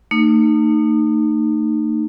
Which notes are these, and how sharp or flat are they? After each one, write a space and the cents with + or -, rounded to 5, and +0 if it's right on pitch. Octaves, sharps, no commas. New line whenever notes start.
A3 +45 D#4 -30